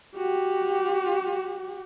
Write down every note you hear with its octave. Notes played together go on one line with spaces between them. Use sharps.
F#4 G4